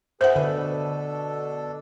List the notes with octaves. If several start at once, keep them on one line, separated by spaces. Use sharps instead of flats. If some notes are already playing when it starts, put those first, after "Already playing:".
G#4 B4 C5 E5 F#5
B2 D3 D4 A4 B4